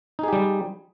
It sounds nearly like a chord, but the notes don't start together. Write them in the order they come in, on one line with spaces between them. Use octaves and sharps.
D#4 G#4 G4 G3